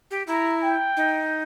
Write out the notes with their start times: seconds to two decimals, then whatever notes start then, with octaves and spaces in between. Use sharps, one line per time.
0.11 G4
0.27 E4 A#5
0.62 G5
0.97 D#4